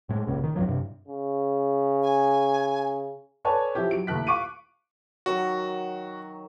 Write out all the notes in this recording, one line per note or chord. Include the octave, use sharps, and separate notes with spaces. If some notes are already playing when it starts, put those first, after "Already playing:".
A2 G#3
G1 C#2 A#2 C#3
D#3
C#2 G2 F3 F#3
G2 C3
C#3
G#5
A4 B4 C#5 D5 G#5 A5
F3 E4 G4
F#3 D7
D#2 A3 E4 A4 F#6 B6
F5 C#6 D6 D7 D#7
D#3 F#3 F#4